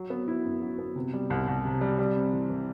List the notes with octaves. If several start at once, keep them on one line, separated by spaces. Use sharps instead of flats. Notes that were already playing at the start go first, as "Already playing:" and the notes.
Already playing: F#3
B3
E4
F#2
F#3
B3
C3
G3
C2
C2
C3
G3
G3
C4
E3
E3